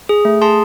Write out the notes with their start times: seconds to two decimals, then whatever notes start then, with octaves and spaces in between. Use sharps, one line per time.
0.09 G#4
0.25 A3
0.42 G#4 A5 C6